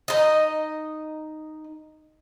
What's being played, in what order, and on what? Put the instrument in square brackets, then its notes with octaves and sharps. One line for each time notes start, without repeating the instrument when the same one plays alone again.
[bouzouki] D#4 D#5